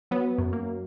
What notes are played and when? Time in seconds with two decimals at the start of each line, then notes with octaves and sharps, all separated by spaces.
0.11 F#3 B3
0.38 F#2
0.53 A#3